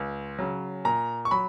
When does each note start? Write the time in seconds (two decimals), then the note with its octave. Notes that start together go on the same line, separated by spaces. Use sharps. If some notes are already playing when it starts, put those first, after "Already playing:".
Already playing: C#2
0.39 C#3 F#3
0.85 A#2 A#5
1.25 C#6
1.31 F#3 B5